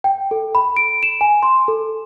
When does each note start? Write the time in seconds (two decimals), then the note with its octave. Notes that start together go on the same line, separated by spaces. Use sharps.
0.04 G5
0.31 A4
0.55 B5
0.77 D7
1.03 E7
1.21 G#5
1.43 C6
1.68 A4